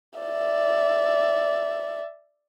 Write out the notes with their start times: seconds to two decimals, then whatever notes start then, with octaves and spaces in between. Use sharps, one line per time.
0.19 D5 E5